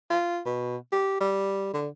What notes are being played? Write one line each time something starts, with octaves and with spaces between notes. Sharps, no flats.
F4
B2
G4
G3
D3